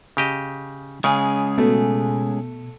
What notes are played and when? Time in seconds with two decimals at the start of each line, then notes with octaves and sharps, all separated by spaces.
0.17 C#3 G4 D#5
1.04 C#3 G#3 C#4 G#4
1.58 B2 A3